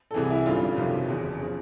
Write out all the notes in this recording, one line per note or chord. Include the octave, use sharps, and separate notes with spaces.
A4
C2 C3 E3 G#4
E4
G#1 F#2 D3 G3 F4
G1 F2 C3 D#3 F#3
F#1 E2 B2 G#4
C#3 F3